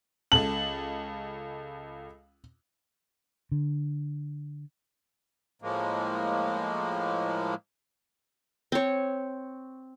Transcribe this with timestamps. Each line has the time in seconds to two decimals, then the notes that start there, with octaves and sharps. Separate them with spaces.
0.32 C#2 A4 A5 F#7
3.52 D3
5.62 A2 F3 G#3 A#3
8.72 C4 C#5